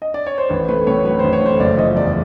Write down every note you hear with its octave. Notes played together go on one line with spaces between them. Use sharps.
D#5
D5
C#5
C5
A1 B4
A3 B4
A2 C#5
F#3 B4
A1 C5
C#5
A3 C5
F#1 D5
F3 D#5
E2 D5